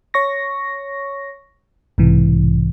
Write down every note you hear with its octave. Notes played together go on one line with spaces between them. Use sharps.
C#5 C#6 A#6
B1 G#2 C3 E3